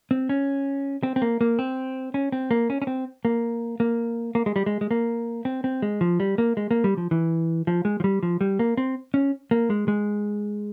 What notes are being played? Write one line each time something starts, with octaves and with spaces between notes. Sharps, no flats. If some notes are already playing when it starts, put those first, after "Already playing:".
C4
C#4
C4
C4
A#3
A#3
C4
C#4
C4
A#3
C#4
C#4
C4
A#3
A#3
A#3
G#3
G3
G#3
G#3
A#3
C4
C4
G#3
F3
G3
A#3
G#3
A#3
G3
F3
E3
F3
G#3
F3
G3
F3
G3
A#3
C4
C#4
A#3
G#3
G#3